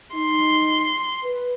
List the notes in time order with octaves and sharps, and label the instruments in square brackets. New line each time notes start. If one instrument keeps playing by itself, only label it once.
[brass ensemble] D#4 [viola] C6
[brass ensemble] B4